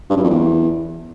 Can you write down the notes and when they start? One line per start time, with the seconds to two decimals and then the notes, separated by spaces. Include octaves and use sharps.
0.10 G2
0.17 F#2
0.24 F2
0.30 E2